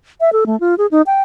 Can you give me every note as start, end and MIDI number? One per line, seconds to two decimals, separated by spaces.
0.21 0.30 76
0.33 0.44 69
0.46 0.58 57
0.60 0.75 65
0.78 0.87 68
0.91 1.02 63
1.06 1.22 79